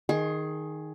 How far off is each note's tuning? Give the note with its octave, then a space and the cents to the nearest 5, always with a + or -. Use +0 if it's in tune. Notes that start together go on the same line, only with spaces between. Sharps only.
D#3 +0 G#4 +10 C6 +35